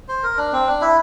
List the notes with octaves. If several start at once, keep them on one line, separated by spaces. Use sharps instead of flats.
C5
A#4
D4
C4
D4
E4